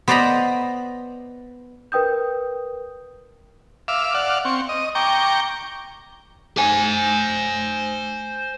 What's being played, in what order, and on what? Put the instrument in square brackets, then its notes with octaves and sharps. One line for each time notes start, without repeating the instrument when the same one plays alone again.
[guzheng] B3 C5 D5 D#5 A#5 B5
[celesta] A#4 B4 G5 D#6 G6
[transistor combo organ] E5 F5 D6
D5 F5 F#5
C4 C#6
D#5
G5 A#5 C#6 D6
[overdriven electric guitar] C5 G#5